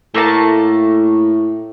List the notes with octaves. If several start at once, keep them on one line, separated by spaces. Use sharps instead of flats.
A2 A3 A#3 A5